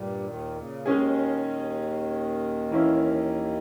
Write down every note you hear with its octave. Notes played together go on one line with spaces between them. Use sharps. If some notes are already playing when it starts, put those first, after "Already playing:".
Already playing: G2 A#2 G3
D#2 D#3
C#3
D#2 D#3 G#3 C#4 G#4
E3 A#3 C#4 E4